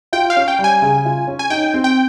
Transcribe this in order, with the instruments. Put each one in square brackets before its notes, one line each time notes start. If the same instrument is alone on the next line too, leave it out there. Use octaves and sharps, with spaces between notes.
[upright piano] F4 [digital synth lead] G5
[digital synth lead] F5
[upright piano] C#4
[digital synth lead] G5
[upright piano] G3
[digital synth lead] G#5
[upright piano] C#3
F4
C#4
[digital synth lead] G#5
[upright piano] D#4 [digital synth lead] G5
[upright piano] C4
[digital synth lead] G5